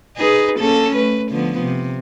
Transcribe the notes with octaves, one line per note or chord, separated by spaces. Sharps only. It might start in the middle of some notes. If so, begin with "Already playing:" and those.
D#4 G#4 B4
A#3 C#4 A4
A3 B4
D3 F3 B3
C3